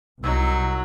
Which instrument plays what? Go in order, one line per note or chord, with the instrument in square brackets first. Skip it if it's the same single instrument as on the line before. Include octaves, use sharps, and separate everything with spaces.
[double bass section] C2 [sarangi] F#3 [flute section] D#4 E6